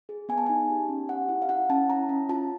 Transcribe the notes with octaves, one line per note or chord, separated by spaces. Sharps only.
G#4
B3 G#5
A5
D#4 G#5
G4
C#4
G4 F#5
E4
F5
E4 F#5
C#4 A5
E4 A#5
C#4
F4 A5